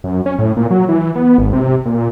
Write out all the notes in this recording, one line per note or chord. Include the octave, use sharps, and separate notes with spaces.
F#2
C#4
A2
A#2
F#3
E3
B3
G#1
C3
A#2